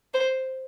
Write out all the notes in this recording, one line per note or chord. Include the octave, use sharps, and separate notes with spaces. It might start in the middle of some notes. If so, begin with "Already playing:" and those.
C5